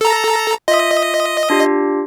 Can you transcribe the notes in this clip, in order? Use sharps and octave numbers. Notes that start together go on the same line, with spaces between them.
A4 A#5
F4 D#5 E5
D4 F4 G4